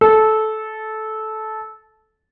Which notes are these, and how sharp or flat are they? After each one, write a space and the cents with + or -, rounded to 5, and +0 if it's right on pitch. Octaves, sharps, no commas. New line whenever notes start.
A4 -15